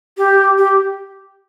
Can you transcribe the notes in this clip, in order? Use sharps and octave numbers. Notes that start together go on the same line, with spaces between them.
G4
G4